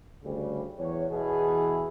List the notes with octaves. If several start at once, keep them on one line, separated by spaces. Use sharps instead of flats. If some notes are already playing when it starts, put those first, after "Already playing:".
D2 C#3 G3
E2 C#5
E2 B2 E3 G#4